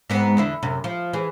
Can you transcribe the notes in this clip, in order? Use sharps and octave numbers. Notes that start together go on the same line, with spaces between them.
G#2 B3 C4
E2 D3 E4
F#2 C3
F3
E3 G#4